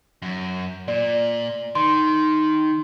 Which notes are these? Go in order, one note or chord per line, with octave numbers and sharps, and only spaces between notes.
F#2
A#2 D5
D#3 C6